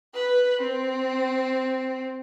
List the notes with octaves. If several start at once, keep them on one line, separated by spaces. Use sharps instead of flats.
B4
C4